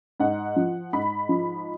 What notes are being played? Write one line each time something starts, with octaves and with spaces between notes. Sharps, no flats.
G#2 F#5
F3
G#2 B5
F3